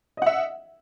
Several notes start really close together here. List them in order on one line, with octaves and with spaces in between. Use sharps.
D#5 F#5 E5